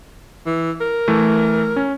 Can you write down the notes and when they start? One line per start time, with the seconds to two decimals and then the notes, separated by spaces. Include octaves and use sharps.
0.46 E3
0.81 A#4
1.08 E3 A3
1.76 C#4